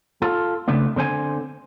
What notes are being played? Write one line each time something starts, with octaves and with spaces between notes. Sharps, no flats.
F4 A4
C#3 A3 B3 C4 D4
D3 C4 C5 G#5